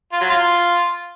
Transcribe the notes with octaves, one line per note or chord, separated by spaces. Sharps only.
F4
F#3
F4